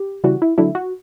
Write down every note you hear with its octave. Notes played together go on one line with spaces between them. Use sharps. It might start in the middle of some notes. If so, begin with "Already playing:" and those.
Already playing: G4
C#3 E3 G3 F#4
E4
D3 F#3 A3 E4
F#4